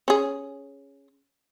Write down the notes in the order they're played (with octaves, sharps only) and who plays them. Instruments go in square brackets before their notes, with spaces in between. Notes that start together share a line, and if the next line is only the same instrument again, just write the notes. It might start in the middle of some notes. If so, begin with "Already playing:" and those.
[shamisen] C#4 G#4